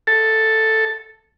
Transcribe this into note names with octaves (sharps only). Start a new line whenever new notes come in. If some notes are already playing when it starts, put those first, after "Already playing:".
A4